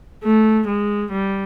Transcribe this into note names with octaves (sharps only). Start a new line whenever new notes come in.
A3
G#3
G3